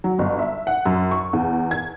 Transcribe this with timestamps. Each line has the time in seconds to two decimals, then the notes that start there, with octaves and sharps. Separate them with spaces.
0.04 F#3
0.19 G1
0.39 E5
0.67 F#5
0.86 F#2
1.11 C#6
1.33 E2
1.71 G#6